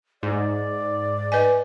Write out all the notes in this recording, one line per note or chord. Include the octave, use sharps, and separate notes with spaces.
G#2 D5
B4 D#5 G#5